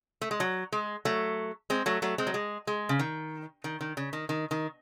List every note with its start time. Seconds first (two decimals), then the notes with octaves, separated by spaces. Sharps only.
0.21 A3
0.31 G#3
0.40 F#3
0.72 G#3
1.05 F#3 A3
1.70 G#3 C4
1.86 F#3 A3
2.02 F#3 A3
2.18 G#3 C4
2.27 F#3
2.34 G#3
2.67 G#3
2.89 C#3
2.99 D#3
3.64 D#3
3.81 D#3
3.97 C#3
4.13 D#3
4.29 D#3
4.51 D#3